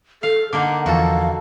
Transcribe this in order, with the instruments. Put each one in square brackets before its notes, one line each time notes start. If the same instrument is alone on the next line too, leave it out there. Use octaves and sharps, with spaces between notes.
[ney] A4 [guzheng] F5
[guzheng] D3 A#3 D#4 [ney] F#5 [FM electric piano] D6
[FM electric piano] E2 F3 A5 [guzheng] F#4 A4 [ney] F5